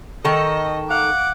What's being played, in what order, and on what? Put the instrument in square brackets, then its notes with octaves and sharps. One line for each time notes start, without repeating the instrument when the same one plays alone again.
[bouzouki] D#3 A4 [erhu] D#5 [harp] C#6
[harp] F5 [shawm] F#5 [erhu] D6